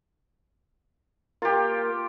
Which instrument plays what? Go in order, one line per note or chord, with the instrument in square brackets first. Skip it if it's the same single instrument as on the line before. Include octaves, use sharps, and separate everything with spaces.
[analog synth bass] A#3 [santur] F4 G4